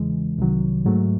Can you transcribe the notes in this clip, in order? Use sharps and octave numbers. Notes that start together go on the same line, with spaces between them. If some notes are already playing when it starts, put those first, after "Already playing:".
Already playing: E2 C#3 E3 G#3
C2 C3 D#3 F#3
G#2 F#3 A3